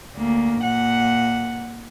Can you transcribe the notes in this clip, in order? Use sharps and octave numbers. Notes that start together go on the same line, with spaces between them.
D2 A#3
A#2 F#5